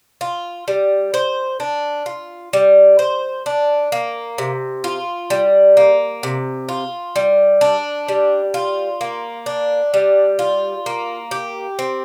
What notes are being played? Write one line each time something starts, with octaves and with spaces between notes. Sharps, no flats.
F4
G3
C5
D4
F4
G3
C5
D4
A#3
C3
F4
G3
A#3
C3
F4
G3
D4
G3
F4
A#3
D4
G3
F4
A#3
G4
C4